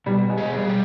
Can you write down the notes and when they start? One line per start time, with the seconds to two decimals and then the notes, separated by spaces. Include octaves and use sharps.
0.06 B2 G3
0.30 G#3
0.38 G#4
0.52 G3
0.68 G3